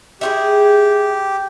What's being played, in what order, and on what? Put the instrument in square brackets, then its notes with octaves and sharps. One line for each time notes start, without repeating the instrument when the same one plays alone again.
[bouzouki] E4 F4 G#4 [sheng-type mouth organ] G4